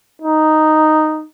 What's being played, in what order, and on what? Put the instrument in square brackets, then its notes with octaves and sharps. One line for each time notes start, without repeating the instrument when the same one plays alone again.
[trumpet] D#4